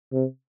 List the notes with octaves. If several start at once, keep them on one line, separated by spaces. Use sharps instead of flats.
C3